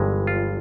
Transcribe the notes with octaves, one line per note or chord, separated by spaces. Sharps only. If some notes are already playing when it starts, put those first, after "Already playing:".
Already playing: G1 G2 E3 G#3
F4